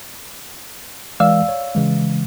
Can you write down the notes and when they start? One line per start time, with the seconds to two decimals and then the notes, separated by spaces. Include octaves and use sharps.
1.20 E3 G#3 D5 F5 E6
1.49 C#5
1.75 C#3 E3 G#3